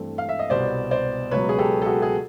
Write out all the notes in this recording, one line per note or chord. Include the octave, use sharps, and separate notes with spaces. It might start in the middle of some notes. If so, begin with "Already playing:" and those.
Already playing: G2 E3 A3 C4
F5
E5
D#5
C2 B2 G3 B3 C5 D5
C5 D5
C#2 B2 F#3 B4 C#5
G#4
G4 A4
A4
F#4 G#4
G#4